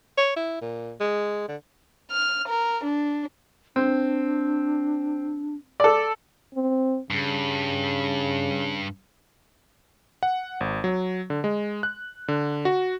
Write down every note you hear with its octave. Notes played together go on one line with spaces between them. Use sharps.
C#5
E4
A#2
G#3
D3
F6
A#4
D4
C4 D4
A4 D5
C4
G2 C#3
F#5
G#1
F#3
D3
G#3
F#6
D3
F#4